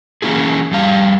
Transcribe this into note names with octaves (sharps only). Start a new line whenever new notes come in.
E3 F#3 A#3 C#4 E4 G#4
F2 G3 F5